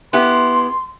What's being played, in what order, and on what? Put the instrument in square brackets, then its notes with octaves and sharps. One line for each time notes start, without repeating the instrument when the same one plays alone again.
[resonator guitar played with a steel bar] B3 E4 G4 [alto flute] C6